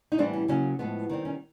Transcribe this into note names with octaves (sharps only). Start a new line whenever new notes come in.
D#4
A2 E3 G3 B3 C4 D4
C#4
C#3 F#3 A#3 C#4
A2 F3 G#3 B3
D#3 G3 C4
C#4